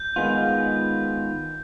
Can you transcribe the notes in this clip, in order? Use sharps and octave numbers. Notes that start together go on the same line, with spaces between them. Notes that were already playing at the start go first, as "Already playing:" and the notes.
Already playing: G6
D#3 G#3 B3 F4